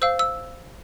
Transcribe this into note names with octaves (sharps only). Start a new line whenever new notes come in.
C5 F5 E6
E6